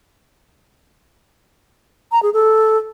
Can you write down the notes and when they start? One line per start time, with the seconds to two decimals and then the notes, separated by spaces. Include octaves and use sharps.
2.12 A#5
2.23 G#4
2.34 A4